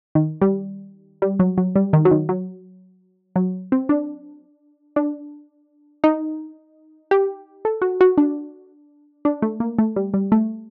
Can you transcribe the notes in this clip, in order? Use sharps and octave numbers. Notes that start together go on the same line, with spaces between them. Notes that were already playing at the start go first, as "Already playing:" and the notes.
D#3
G3
G3
F#3
F#3
G3
D#3
F#3
D#3
F#3
F#3
C4
D4
D4
D#4
G4
A4
F#4
F#4
D4
D4
A3
A#3
A3
G3
G3
A3